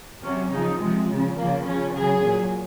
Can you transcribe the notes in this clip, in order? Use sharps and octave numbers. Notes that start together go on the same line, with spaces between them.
C3 F#3 C#4
C#3 F3 D#4
C3 F3 G#3
C#3 F3
C#3 F3 A#3
C#3 F3 C#4
C#3 F#3 G#4
A#2 F#3